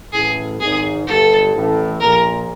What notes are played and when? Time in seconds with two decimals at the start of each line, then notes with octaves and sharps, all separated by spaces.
0.13 A1 A2 G#4
0.60 G#1 G#2 G#4
1.07 G1 G2 A4
1.54 A1 A2
2.00 A#1 A#2 A#4